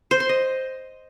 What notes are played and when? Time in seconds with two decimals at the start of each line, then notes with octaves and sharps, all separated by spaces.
0.11 C5
0.20 C6
0.29 D#5